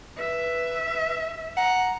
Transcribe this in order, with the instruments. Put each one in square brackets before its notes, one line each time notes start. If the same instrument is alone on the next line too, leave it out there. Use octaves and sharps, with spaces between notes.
[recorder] B4 [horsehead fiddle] E5
[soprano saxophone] F#5 [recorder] A#5